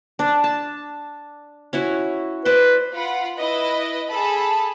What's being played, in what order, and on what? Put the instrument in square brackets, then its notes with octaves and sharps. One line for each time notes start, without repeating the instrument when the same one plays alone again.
[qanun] D4
A5
C#4 E4 F#4
[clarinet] B4 [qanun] C5 D5 C6
[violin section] F4 F#5 B5
E4 B4 D#5
G#4 A4 A5 B5